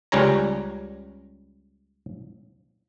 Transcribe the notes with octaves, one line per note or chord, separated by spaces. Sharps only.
C#2 G3 C#4 C#5 A#5